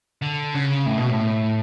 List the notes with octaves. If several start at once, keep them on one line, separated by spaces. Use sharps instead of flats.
D3
C#3
A2
B2
A2